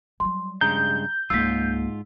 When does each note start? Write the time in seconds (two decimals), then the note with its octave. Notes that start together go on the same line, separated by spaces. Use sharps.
0.20 F#3 G3 C6
0.61 G2 C#3 G#3 A#5 G6
1.30 C#2 G#2 A#3 F4 E6 B6